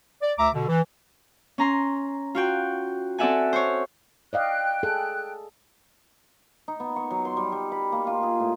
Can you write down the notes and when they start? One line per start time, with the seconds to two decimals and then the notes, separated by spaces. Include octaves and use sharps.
0.21 D5
0.38 D2 E5 A#5 D6
0.53 B2 D3
0.67 E3
1.58 C#4 A#5 C6
2.35 F4 F#4 G5
3.18 C4 A4 D5 E5 F#5 G#5
3.53 C5 C#5
4.33 D5 D#5 F5 G5 F#6
4.83 G#4 A4
6.68 D#4
6.80 B3
6.96 C#6
7.11 F#3
7.25 C6
7.37 G3
7.52 G3
7.72 B5
7.92 A#3
8.07 F4
8.23 G#4
8.40 A2